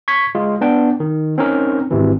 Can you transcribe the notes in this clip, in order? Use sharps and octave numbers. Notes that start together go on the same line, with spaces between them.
C#6 G#6 B6
G#3 F4
B3 D4 G5
D#3
C4 C#4 D#4 A#4
G#1 C3 E3